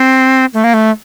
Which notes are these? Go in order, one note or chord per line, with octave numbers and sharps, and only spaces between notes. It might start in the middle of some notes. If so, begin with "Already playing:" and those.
Already playing: C4
A3
A#3
A3